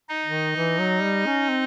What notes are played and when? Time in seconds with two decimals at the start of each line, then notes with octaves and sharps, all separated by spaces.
0.09 D#4 D#5
0.25 D#3
0.56 E3
0.79 F#3
1.03 G3
1.26 C#4
1.49 C4